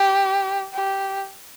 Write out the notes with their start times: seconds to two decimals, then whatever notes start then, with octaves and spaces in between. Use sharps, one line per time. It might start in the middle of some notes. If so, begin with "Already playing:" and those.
Already playing: G4
0.73 G4